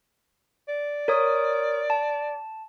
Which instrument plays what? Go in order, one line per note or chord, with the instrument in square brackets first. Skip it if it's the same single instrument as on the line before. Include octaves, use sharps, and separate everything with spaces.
[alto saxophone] D5
[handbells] A#4 C#5 D#6
A5